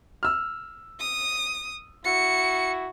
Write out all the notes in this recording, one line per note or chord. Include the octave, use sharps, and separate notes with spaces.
E6 F6
D#6
E4 F#4 C#7